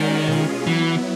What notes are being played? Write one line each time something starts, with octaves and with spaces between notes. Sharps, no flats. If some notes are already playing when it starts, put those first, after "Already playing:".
Already playing: D#3 G#3 C#4 F#4 A#4 D5
B2 G#3 C#4 F4 G#4
E3 F#3 B3 E4